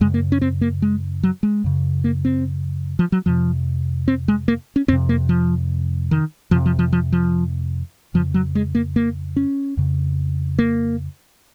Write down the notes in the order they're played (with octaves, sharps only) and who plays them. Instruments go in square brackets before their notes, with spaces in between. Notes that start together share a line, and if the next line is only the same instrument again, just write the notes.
[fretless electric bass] F#2 C#3 G#3
A#3
C#4
C4
A#3
G#3
F#3
G#3
F#2 C#3
A#3
C4
F3
F#3
F2 C3 F3
C4
G#3
A#3
C#4
F2 C3 C4
A#3
F3
D#3
F2 C3 F3
F3
F3
F3
F3
F2 C#3 F3
F#3
G#3
A#3
A#3
C#4
F2 C#3
A#3